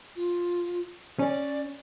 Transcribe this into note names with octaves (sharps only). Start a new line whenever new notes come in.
F4
C#4 D5